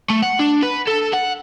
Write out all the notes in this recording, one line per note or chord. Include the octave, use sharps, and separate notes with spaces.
A3
F#5
D4
B4
A4
F#5